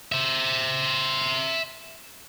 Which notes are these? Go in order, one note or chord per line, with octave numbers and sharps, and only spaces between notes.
C5 E5